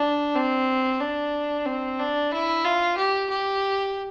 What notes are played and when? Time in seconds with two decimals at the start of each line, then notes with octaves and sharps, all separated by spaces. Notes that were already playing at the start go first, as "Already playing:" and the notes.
Already playing: D4
0.35 C4
1.00 D4
1.66 C4
1.99 D4
2.31 E4
2.65 F4
2.97 G4
3.30 G4